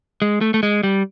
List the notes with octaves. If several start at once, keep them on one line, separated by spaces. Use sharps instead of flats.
G#3
A3
A3
G#3
G3